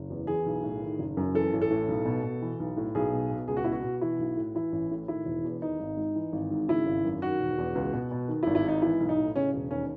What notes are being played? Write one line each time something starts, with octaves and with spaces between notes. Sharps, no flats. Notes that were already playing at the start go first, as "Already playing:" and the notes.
Already playing: F#1
E2
E3 G#4
B1
A2
D#3
F#1
F#2
E3 A4
A1
A4
A2
B1
B2
B2
E3
B1
A2
B1 G#4
B2
B2
C#2 G#4
F#4
B2 E4
F#4
B2
E3 E4
B1
A2
E3 E4
A1
A2
D#3 E4
E1
E2
D#3 D#4
G#1
G#2
E3
G#1
G#2
C#3 E4
G#1
F#2
D#3 F#4
E1
E2
C#2
B2
B2
D#3
E4
G#1
E4
G#2 D#4
E3 E4
B1
D#4
A2
C#3 C#4
E1
D#2 C#4